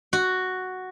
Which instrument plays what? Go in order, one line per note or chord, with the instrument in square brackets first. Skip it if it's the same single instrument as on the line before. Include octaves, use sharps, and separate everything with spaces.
[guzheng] F#4